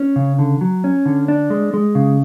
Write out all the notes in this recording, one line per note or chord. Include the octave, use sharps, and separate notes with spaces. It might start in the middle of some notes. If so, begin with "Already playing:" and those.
Already playing: C#4
C#3
D3
F#3
C#4
D3
D4
G#3
G#3
C#3